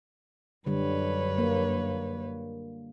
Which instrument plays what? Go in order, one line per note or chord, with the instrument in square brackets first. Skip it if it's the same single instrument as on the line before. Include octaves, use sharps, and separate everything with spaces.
[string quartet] F#2 B4 C#5 [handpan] D3 G3
[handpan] A#3